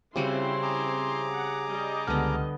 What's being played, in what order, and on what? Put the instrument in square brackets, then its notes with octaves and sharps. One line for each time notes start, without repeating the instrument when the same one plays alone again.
[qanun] C#3 G3 F#4 [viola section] C4 E4 C6 [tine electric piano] G4
[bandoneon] G#4 A#5 D6
[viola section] F#5
G3 D#5
[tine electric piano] C#2 F6 [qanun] D3 B3